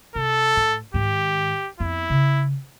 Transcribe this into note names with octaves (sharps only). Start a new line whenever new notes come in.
C3 A4
A2
G#2 D#3 G4
F2 B3 E4
C#3